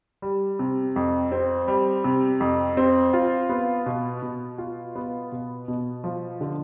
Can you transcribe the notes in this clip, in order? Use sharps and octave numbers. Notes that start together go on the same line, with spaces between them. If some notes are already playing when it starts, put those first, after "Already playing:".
G3
C3
F2
C4
G3
C3
F2
C4
F4
B3
B2
B2
F4
B3
B2
B2
F3
D3